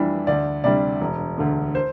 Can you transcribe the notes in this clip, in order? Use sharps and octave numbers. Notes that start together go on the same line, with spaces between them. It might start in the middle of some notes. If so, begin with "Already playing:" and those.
Already playing: F2 E3 G3 D4
D2 D5
C3 G3 D4 D5
E1
D2 D3
C5